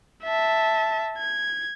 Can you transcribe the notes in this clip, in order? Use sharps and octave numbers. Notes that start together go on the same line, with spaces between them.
E5 A5
G#6